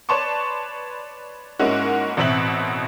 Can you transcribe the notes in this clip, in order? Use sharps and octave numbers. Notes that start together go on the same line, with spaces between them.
B4 C#5 D5 A5 C6 C#6
G#2 G#3 A#3 C#4 E4 F#4
A1 B2 C4 E5 F#7